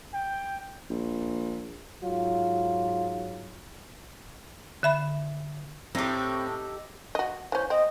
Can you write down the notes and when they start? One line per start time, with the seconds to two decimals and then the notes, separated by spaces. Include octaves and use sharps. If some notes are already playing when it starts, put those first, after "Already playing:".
0.14 G5
0.90 A#1
2.04 G#2 F#3 F4
4.83 D3 E5 B5
5.95 A2 C4 D#4 G4 E6
7.15 F#4 D#5
7.52 E3 C#4 C5
7.70 C4 D#5